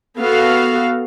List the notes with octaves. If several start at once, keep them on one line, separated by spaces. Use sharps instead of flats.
B3 F#4 A4 F5